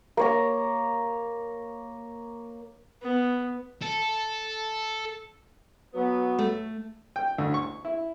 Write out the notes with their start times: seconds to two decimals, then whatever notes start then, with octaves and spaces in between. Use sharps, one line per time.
0.17 A#3 C#5 A#5
3.02 B3
3.82 A4
5.94 F#3 B3
6.38 A3
7.16 G5
7.38 D2
7.54 C#6
7.85 E4